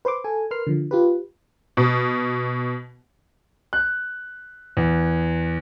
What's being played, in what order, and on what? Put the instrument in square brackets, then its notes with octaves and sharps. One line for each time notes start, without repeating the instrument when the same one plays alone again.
[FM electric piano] B4 C5 C6 D6
A4 G#5
A#4 B4 C6 F6 C7
D3 F3
F4 G4 B4
[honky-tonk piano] B2
[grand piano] F#6
E2